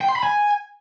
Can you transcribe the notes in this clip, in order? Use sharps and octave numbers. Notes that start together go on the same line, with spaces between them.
G5
C6
B5
G#5